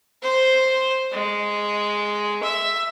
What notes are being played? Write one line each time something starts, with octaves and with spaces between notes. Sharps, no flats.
C5
G#3
E5